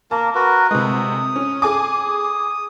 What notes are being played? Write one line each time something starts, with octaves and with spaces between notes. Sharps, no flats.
A#3 A#4 A5
F#4 A#4 B4
C3 G#3 D#6
C#4
G#4 G#5 D6